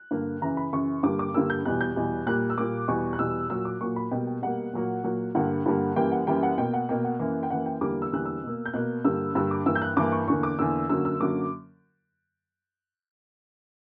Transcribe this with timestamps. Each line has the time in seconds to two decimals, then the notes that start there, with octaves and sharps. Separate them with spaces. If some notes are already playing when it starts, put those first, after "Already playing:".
Already playing: F#6
0.11 G2 D3 A#3
0.42 F#2 C#3 E3 A#5
0.57 B5
0.73 F#2 C#3 E3 C#6
1.03 G2 D3 G3 A#3 D6
1.19 D6
1.34 G2 D3 G3 A#3 E6
1.50 G6
1.65 E2 B2 G3 F#6
1.81 G6
1.96 E2 B2 G3
2.27 A#2 G3 A#3 F#6
2.50 E6
2.58 A#2 G3 A#3 D6
2.88 E2 B2 G3 C#6
3.13 F#6
3.19 E2 B2 G3 E6
3.50 A#2 F#3 A#3 E6
3.65 D6
3.81 A#2 F#3 A#3 C#6
3.96 B5
4.11 B2 G3 A#3 G5
4.27 G5
4.42 B2 G3 A#3 F#5
4.73 A#2 F#3 A#3
5.04 A#2 F#3 A#3
5.35 G2 D3 G3 A#3 F#5
5.66 G2 D3 G3 A#3
5.96 F#2 E3 G3 A#3 G5
6.12 F#5
6.27 F#2 E3 G3 A#3 G5
6.43 F#5
6.58 B2 A#3 G5
6.73 F#5
6.89 B2 A#3 G5
7.04 F#5
7.19 F#2 E3 A#3
7.43 G5
7.50 F#2 E3 A#3 F#5
7.66 G5
7.81 E2 D3 G3 A#3 D6
8.02 E6
8.12 E2 D3 G3 A#3 F#6
8.25 E6
8.43 B2 A#3
8.66 G6
8.74 B2 A#3 F#6
9.04 G2 D3 G3 A#3 E6
9.35 G2 D3 G3 A#3 E6
9.51 D6
9.66 G2 E3 A#3 E6
9.75 G6
9.82 F#6
9.97 G2 E3 A#3 D6
10.12 C#6
10.27 E2 D3 A#3 C#6
10.43 D6
10.59 E2 D3 A#3 E6
10.89 F#2 D3 F#3 A#3 E6
11.05 E6
11.20 F#2 D3 F#3 A#3 D6